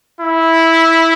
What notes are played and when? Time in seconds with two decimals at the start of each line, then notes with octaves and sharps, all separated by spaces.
0.21 E4